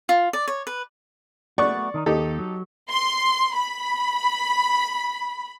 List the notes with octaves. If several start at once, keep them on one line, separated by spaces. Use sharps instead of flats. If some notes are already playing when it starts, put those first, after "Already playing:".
F4
D5
C#5
B4
A3 B3 F#4 D5 C#6
D#3 D4 D#4
D#2 D#4 G4 A4
F#3
C6
B5